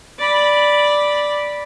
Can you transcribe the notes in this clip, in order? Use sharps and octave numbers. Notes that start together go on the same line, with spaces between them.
D5 B5